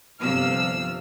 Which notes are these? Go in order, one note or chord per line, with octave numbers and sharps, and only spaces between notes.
G1 C3 F3 E6 F6